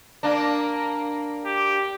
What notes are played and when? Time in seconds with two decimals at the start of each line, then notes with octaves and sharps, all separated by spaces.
0.23 A#3 D4
1.45 G4